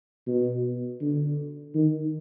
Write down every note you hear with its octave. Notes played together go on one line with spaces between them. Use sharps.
B2
D3
D#3